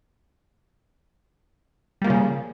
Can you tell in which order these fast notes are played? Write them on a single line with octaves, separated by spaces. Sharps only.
G3 A#3 F3 C#3